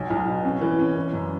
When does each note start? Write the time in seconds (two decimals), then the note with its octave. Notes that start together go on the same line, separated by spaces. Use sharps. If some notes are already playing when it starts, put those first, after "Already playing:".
Already playing: B1
0.10 B1
0.27 B2
0.45 C#4
0.61 E3
0.79 C#4
0.95 E3
1.13 F#2